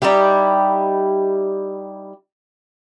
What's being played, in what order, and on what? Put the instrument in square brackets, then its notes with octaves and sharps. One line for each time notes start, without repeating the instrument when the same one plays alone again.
[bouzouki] G3 D#4 E4 G4